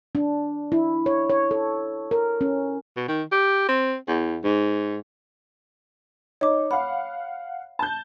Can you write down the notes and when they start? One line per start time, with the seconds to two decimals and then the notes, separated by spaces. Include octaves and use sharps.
0.15 D4
0.72 E4
1.06 C#5
1.30 C#5
1.51 A4
2.11 A#4
2.41 C#4
2.96 B2
3.08 D#3
3.32 G4
3.69 C4
4.08 E2
4.44 G#2
6.41 D#4 C#5 D6
6.71 F5 F#5 B5
7.79 A5 G6